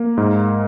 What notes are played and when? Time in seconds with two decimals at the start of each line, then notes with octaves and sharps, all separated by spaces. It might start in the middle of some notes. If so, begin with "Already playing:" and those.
Already playing: A#3
0.17 G#2